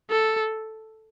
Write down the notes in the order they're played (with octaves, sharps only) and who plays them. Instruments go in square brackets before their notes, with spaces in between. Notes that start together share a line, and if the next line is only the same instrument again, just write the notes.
[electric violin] A4